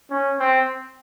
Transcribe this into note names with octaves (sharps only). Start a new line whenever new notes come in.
C#4
C4